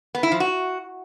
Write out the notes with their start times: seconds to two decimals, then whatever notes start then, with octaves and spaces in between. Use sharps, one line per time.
0.15 B3
0.23 E4
0.32 F3
0.40 F#4